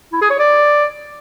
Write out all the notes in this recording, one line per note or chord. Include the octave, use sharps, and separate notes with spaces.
E4
G#4
C#5
D5